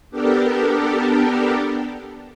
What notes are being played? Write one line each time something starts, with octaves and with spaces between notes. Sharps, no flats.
B3 D4 G4 A4 A#4